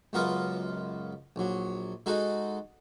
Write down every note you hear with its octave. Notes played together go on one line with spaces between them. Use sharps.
C#2 F#2 B3 F4 A#4 D#5
A#1 F#3
G#3 D#4 F#4 A4